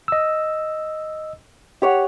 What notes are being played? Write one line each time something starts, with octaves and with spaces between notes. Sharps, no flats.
D#5 E6
G4 C#5 F#5